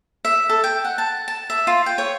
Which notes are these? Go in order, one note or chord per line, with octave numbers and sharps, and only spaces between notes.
E5
A4
G5
F#5
A5
A5
E5
F4
G5
C#5